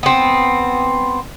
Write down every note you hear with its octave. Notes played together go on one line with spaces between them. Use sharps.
B3 C4